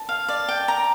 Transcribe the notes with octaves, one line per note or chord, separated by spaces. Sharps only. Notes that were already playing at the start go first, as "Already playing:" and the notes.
Already playing: A5
F5
D5
G5
A#5